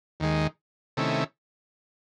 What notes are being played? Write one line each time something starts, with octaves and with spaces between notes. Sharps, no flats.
D#2 D#3 G#3
C3 D#3 A3 C#4 E4